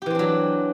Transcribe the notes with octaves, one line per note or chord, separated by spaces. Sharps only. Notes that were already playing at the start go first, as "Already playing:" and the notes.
E3 F#3 C4 D4 G4